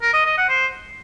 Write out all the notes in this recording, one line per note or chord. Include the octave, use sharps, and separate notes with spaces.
A#4
D#5
D#5
F#5
C5